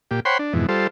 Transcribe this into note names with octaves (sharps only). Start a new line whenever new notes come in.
A#2 G4
C5 C#5 F#5 G5 B5 C6
D4
F2 G#2 B2 E3
G3 F4 A4 C5